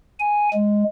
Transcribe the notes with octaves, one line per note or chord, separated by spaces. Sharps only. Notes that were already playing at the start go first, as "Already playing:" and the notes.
G#5
G#3